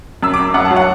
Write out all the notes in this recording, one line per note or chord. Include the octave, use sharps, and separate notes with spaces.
F#2 E6
D6
F#2
F#2 F#5
A5
F#3
F#5